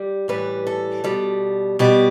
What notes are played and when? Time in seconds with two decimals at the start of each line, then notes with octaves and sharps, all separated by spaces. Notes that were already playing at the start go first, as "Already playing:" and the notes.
Already playing: G3
0.28 A2 E3 G3 B4
0.67 A4
1.04 B2 G3
1.79 B2 G3 G4